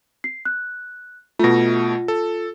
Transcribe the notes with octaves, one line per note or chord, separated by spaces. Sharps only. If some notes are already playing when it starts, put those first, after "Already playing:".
C7
F#6
B2 A3 F4 A#6
A4